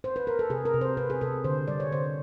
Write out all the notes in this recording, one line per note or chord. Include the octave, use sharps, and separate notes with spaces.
C5
B4
A#4
A4
C3 G#4
A#4
C3
C5
C3 B4
G#4
C3 A4
D3 C5
G3 D5
C#5
D3 C5